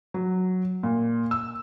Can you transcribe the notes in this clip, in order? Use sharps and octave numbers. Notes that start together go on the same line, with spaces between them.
F#3
A#2
E6